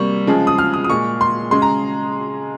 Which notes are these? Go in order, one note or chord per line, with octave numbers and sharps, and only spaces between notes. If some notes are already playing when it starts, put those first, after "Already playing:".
Already playing: C3 G3 A#3 C#6
C#3 F3 G#3
D#6
F6
D#6
D#6
A#2 G#3 C#6
C6
C#3 G#3 C6
A#5